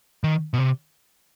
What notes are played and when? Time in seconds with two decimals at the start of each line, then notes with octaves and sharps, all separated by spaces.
0.24 D#3
0.54 B2
0.59 C3